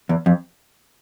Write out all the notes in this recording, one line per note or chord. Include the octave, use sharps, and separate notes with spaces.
E2
F2